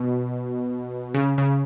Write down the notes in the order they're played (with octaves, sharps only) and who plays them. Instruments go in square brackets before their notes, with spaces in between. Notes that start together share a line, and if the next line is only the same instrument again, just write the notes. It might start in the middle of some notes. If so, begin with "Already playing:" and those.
Already playing: [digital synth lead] B2
C#3
C#3